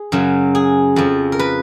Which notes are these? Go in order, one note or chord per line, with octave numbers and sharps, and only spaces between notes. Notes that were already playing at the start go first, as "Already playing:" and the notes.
Already playing: G#4
F#2 C#3 F#3
G#4
F2 F3
A#4
B4